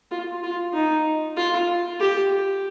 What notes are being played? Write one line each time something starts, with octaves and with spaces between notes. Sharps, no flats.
F4
F4
D#4
F4
G4